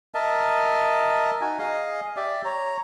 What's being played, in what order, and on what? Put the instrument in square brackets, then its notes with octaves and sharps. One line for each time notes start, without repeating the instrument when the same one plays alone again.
[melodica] A#4 D#5 E5 A5
D#4 F#4 G#5
G#4 D#5 F5
G4 D5 E5
C#5 A#5